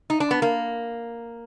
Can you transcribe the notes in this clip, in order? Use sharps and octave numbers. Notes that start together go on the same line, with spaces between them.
D#4
D4
B3
A#3